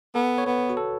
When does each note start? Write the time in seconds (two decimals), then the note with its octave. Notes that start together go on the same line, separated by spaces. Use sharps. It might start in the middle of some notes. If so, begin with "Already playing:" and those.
0.15 B3 A4
0.38 C#5
0.46 B3 B4
0.70 F#4
0.77 A4